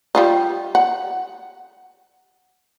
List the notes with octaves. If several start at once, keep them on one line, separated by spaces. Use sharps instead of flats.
G3 F4 D#5
F#5